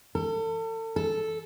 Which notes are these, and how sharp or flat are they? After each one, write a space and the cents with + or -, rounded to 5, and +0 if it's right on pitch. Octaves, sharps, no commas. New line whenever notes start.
A4 +35
A4 -5